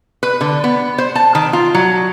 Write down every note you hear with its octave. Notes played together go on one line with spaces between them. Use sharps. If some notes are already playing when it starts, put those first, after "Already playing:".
B4
D3
B3
C5
A5
D#3
F4
F#3